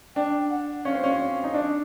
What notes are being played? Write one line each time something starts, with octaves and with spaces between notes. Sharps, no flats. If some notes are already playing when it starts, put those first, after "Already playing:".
D4 G5
F#5
C#4 F5
C4
C#4
D#4
D4